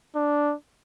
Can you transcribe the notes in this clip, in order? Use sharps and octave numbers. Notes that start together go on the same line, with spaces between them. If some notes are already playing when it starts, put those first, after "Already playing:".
D4